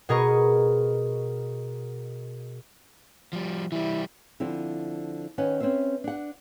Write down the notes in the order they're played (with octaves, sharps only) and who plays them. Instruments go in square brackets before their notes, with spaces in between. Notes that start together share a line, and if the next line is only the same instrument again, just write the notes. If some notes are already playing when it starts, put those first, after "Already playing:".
[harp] B2 G#4 A#4 D#5 C#6
[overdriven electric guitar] F3 G3
[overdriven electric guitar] E3 G3 [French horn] E4
[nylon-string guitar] D3 F3 C4 E4
D#3 C#4 B4 F#5 G#5
C4 C#4 B4 C5 E5
D4 F#5